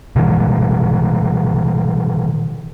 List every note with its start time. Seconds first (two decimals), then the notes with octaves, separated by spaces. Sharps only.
0.16 B2 D#3 E3 G#3